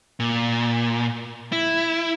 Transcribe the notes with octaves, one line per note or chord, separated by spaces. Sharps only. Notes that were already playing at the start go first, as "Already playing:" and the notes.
A#2
E4